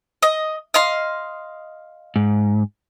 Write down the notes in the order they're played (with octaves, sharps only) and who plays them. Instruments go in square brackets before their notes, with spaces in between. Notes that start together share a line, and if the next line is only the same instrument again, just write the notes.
[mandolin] D#5
D#5 F5 C6
[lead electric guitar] G#2